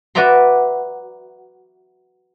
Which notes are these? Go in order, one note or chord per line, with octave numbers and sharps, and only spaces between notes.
F#4 B4 D5 E5 A#5 C6